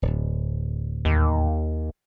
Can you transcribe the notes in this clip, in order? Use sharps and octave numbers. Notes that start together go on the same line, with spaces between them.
D1
D#2